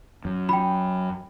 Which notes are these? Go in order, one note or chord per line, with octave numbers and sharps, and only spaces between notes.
F#2
G5 B5